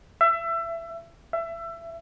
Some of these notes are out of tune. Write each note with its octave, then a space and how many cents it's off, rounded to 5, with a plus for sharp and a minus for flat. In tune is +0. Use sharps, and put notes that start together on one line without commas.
E5 +25
E5 +25